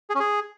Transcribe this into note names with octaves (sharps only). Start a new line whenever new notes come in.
G#4
C#4
G#4